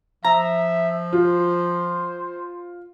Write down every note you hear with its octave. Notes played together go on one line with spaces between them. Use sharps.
F3 E5 A#5
F4 C5